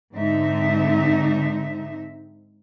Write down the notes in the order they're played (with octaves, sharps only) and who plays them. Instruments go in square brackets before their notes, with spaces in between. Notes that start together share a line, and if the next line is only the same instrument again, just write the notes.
[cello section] G#2 D3 C4 D#4 E5